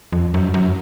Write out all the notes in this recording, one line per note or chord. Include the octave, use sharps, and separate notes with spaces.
F2
F#2
F#2